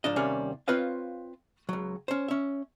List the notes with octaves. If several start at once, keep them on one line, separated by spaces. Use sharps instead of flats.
G#2 F3 D4 D#5
D#2 C3 G3 A#3 C#4 G#5
C4 F4 B4 C#5 D#5 F5
C#2 F#3
C#4 C5
C#4 E5